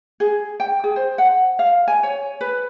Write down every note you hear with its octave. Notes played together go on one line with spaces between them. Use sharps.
G#4
G5
G#4
C5
F#5
F5
G#5
C#5
B4